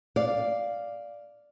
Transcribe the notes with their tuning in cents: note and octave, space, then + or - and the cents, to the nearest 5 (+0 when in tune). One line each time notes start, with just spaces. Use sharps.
D5 +0 F5 +0